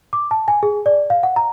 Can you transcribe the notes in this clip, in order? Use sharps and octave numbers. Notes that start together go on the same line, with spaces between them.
D6
A5
G#5
G#4
D5
F5
F#5
A#5